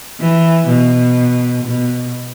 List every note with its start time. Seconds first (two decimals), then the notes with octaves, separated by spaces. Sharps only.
0.20 E3
0.68 B2
1.64 B2